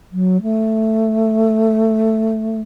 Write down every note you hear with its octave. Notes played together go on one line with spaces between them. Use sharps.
F#3
A3